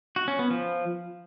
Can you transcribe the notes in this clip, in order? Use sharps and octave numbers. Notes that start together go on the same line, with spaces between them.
F#4
C#4
B3
F3